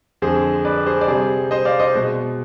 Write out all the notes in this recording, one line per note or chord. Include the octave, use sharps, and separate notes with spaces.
F2 D3 G#3 G#4 C5
B4 D5
G#4 C5
D5
C3 G3 G#4 C5
C5 D#5
D5 F5
C5 D#5
B2 G#3